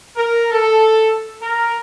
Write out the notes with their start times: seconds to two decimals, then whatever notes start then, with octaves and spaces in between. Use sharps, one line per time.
0.16 A#4
0.52 A4
1.42 A#4